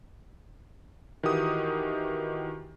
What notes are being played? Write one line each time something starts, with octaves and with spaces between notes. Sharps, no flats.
D#3 E3 F#4 G4 D#6